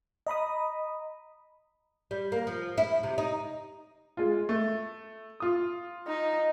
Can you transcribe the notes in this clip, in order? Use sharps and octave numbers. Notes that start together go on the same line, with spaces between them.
D#5 A#5 B5 D#6
G3
A#3
F3
E4
C3
D#4
G#3 F4
A3
F4 D#6
D#4